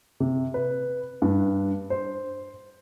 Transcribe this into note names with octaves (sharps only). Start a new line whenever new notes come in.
C3
B4
G2
C5